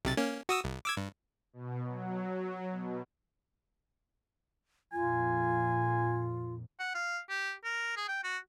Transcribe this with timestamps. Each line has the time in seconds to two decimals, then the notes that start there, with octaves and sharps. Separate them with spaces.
0.05 B1 C3 A6
0.17 A#3 C#4
0.49 F#4 D#6 E6
0.64 C2
0.85 D6 E6 G#6
0.97 G2
1.53 B2
1.85 F#3
2.71 B2
4.93 F2 A#2 F4 G#5
6.80 F#5
6.95 F5
7.29 G4
7.64 A#4
7.96 G#4
8.08 G5
8.24 F#4